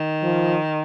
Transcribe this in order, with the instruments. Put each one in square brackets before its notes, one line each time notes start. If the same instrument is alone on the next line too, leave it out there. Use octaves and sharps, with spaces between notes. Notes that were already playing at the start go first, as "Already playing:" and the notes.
Already playing: [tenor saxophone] D#3
[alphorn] F3